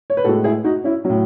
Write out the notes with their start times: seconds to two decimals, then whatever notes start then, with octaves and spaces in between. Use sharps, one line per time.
0.10 C#5
0.17 B4
0.24 A2 G#3 F#4 A4
0.44 E4 G#4
0.64 D#4 F#4
0.84 C#4 E4
1.04 F#3 C#4
1.10 A2